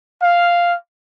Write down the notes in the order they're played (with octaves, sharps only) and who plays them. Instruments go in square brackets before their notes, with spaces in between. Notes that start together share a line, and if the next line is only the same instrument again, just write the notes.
[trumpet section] F5